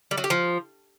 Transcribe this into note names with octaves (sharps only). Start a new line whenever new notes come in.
G3
F#3
G4
F3